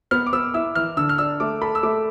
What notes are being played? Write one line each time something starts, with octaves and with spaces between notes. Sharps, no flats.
B3 F6
D6
B3 E6
E4 E6
E3 F6
D3 E6
F6
D4 E6
A3 D6
A4 B5
E6
A3 D6